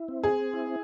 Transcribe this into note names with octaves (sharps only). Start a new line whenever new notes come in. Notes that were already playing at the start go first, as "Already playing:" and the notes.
Already playing: E4
C4
G#4
E4